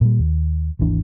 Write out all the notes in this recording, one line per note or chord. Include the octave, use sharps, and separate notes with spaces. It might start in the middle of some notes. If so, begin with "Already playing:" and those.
A#2 G3
D#2
G#1 D#2 E3 D4